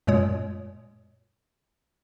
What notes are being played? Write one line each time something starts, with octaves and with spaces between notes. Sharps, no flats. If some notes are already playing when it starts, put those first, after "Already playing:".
F#2 A#2 G#3 C#5 D#6